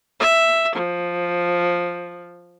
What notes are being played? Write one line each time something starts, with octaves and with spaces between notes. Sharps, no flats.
E5
F3